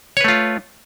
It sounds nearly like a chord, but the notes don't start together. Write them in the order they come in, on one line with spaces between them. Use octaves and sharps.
C#5 B4 A3 F4